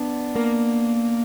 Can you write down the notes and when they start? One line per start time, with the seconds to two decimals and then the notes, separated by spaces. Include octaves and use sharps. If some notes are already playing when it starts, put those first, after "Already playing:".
Already playing: B3 D4
0.35 A#3